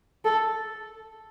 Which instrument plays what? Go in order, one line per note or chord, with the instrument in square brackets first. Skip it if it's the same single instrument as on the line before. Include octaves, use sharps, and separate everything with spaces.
[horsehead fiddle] A4